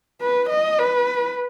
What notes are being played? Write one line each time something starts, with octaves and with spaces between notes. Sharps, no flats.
B4
D#5
B4